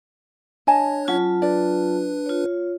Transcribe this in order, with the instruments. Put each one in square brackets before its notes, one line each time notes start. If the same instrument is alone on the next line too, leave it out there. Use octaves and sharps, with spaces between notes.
[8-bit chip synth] D4 C#5 [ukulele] D#5 G#5 A5
[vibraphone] F#3 F4 A5 [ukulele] C#4 F#5
[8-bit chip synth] D4 B4 [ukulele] D5
[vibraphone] F4 C#5